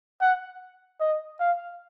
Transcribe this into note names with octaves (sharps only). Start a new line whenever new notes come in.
F#5
D#5
F5